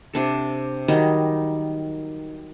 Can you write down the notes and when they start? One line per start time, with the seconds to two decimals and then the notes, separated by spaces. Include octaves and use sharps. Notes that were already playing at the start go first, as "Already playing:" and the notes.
0.14 C3 D4 A4
0.88 D#3 F#3 G3 D#4